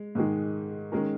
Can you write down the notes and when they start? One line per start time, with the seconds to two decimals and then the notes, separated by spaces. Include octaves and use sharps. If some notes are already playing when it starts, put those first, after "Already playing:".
Already playing: G#3
0.15 G#2 D#3 G#3
0.92 D#3 G#3 C#4 A#4